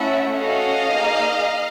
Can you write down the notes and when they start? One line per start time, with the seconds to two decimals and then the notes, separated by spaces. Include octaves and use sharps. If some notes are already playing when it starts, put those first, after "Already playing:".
Already playing: A3 C#4 E4 E5 F#5
0.36 C#4 F#4 A4 D#5 F5
0.91 A#3 D#4 G#4